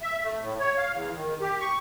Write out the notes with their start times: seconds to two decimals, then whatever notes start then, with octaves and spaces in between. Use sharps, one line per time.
0.02 E5
0.24 A3
0.41 A2
0.60 C#5
0.77 F5
0.93 E2
1.15 D#3
1.41 G4
1.60 C#6